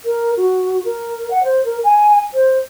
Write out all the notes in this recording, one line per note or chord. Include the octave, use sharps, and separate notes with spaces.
A#4
F#4
A#4
F#5
C5
A#4
G#5
C5